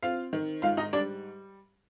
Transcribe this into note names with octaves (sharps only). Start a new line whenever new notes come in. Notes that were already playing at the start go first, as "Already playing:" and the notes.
C4 F4 F5
D#3
G#2 F4 F5
D#4 D#5
G3 D4 D5